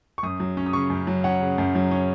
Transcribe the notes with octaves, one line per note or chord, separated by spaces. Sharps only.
C#6
F#2 D#6
F#3
C#4
D#6
C#3 C#6
F#2
F#3
C#4 F#5
C#3
F#2
F#3
C#4